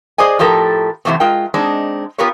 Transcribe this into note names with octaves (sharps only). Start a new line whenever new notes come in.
G#4 C5 D5 D#5 G#5
A2 F3 G4 A4 A#4
F#2 C3 D#3 E3 A3 C4
G#3 F4 A#4 G5
G#3 C4 D4 D#4
B3 F4 G4 A#4 B4 C#5